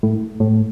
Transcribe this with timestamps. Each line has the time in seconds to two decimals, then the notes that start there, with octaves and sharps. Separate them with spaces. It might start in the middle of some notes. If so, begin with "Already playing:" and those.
0.03 A2
0.40 A2